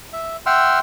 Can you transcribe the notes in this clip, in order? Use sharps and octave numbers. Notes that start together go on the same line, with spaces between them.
E5
E5 F#5 G5 C6 E6 F6